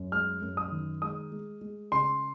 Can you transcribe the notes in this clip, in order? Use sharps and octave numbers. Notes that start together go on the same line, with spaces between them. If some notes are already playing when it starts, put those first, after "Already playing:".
Already playing: F#2
G#3 F6
F#2
D#6
D#3
G#3 D#6
G#3
G#3
C#3 C6